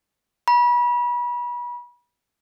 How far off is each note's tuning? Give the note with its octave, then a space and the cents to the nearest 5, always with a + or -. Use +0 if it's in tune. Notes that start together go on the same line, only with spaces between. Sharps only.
B5 -30